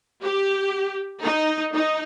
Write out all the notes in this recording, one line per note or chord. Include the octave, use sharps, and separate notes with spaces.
G4
D#4
D#4